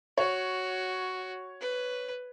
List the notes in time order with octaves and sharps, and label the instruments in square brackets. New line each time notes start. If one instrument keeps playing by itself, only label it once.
[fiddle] F#4 [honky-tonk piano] C#5
[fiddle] B4